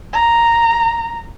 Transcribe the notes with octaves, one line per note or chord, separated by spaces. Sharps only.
A#5